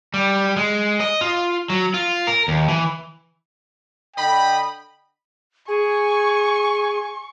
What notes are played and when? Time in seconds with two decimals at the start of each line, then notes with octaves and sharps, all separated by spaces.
0.14 G3
0.56 G#3
1.00 D#5
1.21 F4
1.70 F#3
1.94 F4
2.27 A#4
2.48 D#2
2.68 E3
4.16 D3 D#5 G5 B5
5.68 G#4 G#5 C#6